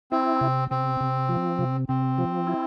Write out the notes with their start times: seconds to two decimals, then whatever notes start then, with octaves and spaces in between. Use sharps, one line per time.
0.11 C4 E4
0.41 C3
0.70 C3 C4
1.01 C3
1.29 F3
1.59 C3
1.89 C3 C4
2.18 F3
2.47 E4